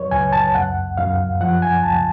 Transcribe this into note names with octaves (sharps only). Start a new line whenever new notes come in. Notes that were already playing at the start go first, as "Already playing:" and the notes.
Already playing: F#2 F#3 B4 C#5
C#2 G#5
A5
F#2 F#5
F#2 F5
F3 F#5
G#5
C#2 A5